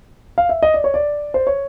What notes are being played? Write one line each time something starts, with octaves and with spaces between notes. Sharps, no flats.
F5
E5
D#5
D5
C#5
D5
C5
C#5